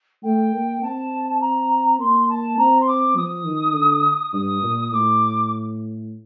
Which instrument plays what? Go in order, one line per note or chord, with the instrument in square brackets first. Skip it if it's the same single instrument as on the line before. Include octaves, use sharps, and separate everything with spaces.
[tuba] A3 [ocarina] G5
[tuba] A#3
[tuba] C4 [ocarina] A5
[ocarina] A#5
[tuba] A#3 [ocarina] C6
[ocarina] A5
[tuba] C4 [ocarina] A#5
[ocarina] C6
D6
[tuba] F3 [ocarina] D#6
[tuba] D#3
D3
[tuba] G2 [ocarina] D#6
[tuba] A#2
[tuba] A2 [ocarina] D6